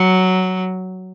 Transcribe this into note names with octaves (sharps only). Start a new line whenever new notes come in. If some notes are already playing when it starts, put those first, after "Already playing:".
Already playing: F#3